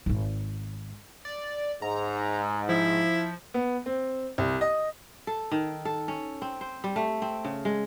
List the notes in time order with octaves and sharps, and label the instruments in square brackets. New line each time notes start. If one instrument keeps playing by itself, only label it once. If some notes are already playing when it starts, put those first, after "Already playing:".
[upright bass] D1 G#1
[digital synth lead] D5
[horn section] G#2 [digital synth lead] A#5
[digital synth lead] F3 [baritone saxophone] E4
[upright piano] B3
C4
C2
D#5
[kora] A4
D#3
A4
C#4
C4
C5
G3
A3
C4
C#3
G#3